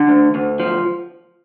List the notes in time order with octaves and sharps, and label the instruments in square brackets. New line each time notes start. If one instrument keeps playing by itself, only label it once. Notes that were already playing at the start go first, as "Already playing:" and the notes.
Already playing: [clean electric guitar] D3
D2
D2
F3